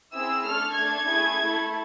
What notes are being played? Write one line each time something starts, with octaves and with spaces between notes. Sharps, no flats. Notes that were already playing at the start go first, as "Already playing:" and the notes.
C4 E4 G#4 E6
A3 D4 A4 F6
A3 D4 A4 G#6
A3 E4 G#4
A3 E4 A4